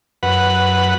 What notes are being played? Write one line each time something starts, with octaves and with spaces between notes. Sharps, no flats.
F#2 B4 F#5